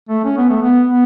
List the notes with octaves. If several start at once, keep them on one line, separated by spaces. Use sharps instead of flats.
A3
C#4
B3
A3
B3
B3